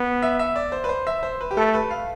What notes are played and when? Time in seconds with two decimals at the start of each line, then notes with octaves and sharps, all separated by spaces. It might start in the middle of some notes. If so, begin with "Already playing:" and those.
Already playing: B3
0.22 E5
0.39 E5
0.56 D5
0.72 C5
0.84 B4
0.89 C5
1.07 E5
1.23 C5
1.41 B4
1.51 G4
1.57 A3 A4
1.74 B4
1.90 F5